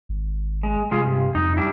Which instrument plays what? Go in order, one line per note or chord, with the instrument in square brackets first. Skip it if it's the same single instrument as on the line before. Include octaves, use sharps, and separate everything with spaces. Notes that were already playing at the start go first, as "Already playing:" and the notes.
[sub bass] G#1
[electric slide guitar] G#3
[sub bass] C3 [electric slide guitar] G#3 F4 G#4
[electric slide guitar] G2
[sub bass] F2 [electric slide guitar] D#4
[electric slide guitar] G3 D4 E4